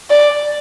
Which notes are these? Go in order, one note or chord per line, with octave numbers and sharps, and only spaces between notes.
D5